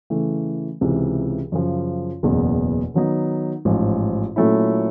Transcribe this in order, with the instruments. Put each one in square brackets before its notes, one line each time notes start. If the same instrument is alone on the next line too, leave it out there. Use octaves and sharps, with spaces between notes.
[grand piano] C#3 E3 A3
C#2 C3 E3
F#2 C#3 F3
F#1 E2 B2
D#3 F#3 B3 D#4
A1 G#2 F3
A#2 F#3 A3 C#4 E4